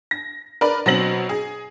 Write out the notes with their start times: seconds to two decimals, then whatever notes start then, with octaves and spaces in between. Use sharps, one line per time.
0.11 A#6
0.61 A#4 B4 D5
0.86 B2 F#3 C4 A#6 F#7
1.29 G#4